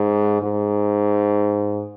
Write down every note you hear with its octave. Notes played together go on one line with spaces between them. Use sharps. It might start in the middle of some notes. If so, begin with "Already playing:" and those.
Already playing: G#2
G#2